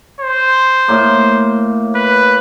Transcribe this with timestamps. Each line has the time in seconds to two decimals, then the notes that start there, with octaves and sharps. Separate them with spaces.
0.20 C5
0.88 A2 A#3
1.95 B4